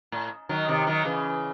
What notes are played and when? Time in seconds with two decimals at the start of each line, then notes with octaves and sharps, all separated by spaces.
0.12 A2
0.49 D#3 F#3
0.68 C3 D#3
0.87 D#3 F#3
1.04 C#3 E3